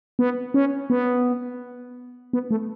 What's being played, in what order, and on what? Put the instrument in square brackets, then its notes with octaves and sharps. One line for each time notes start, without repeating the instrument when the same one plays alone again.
[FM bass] B3
C#4
B3
B3
A3